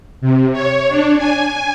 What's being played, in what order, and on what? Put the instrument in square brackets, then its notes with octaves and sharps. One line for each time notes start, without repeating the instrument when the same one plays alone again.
[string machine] C3
C#5
D4
G#5